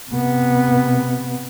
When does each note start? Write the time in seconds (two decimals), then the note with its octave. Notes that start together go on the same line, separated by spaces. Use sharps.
0.11 C3 B3